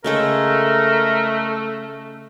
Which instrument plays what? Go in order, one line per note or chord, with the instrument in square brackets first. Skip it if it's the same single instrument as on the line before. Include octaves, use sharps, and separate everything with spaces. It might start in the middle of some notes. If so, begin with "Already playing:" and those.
[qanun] C#3 G#3 A4 [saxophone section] A3 [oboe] A#4